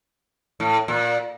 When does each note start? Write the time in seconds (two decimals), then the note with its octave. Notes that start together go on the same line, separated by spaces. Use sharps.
0.60 A2
0.88 A#2